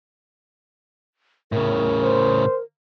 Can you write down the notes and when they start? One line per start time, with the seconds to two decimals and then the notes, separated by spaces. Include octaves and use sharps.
1.52 A2 C#3 A#4
2.03 C5